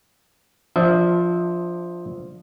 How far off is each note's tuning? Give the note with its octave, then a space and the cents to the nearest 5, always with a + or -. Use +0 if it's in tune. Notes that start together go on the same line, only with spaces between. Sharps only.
F3 +0 D4 +0 E5 -30